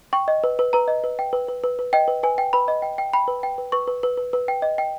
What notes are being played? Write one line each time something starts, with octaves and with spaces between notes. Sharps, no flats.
G5 C#6
D#5
B4
B4
B4 A#5
D#5
B4
G5
B4
B4
B4
B4
D#5 G5
B4
B4 G#5
G5
B4 B5
D#5
G5
G5
G5 B5
B4
G5
B4
B4 C#6
B4
B4
B4
B4
G5
D#5
G5